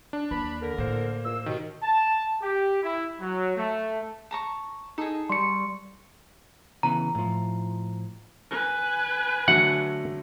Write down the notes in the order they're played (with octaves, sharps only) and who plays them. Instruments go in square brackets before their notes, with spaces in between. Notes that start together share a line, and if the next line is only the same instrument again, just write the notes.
[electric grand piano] D4
[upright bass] D#2 [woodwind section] B5
[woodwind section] D3 A#4
[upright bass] A2 [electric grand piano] A#3 C5
[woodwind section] E2 A#2 E6
[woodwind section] D#2 B2 [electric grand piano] D#3
[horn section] A5
G4
E4
F#3
A3
[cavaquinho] A5 A#5 C#6
[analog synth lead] D#4 [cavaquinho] G#4 A4
[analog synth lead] G3 [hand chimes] C6 C#6 C#7
[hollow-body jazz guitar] C#3 E3 B3 [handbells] A#5
[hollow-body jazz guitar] A2 F3
[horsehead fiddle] B4 G#5
[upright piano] D3 F#3 A3 [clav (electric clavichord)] F#5